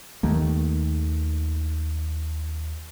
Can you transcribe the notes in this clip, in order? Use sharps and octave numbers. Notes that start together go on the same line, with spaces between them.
D#2 D#3 A3 A#3